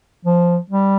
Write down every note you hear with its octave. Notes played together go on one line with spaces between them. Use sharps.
F3
G3